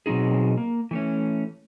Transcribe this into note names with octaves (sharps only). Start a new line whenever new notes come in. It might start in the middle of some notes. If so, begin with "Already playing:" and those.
B2 F#3 C4 D#4 G#4
A#3
E3 A3 C#4